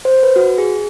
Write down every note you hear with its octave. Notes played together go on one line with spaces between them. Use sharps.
C5
B4
F#4
G#4